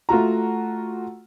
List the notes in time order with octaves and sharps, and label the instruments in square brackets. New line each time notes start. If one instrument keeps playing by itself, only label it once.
[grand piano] A3 F4 F#4 A#5